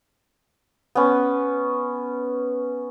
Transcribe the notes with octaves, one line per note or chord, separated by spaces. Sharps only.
B3 C#4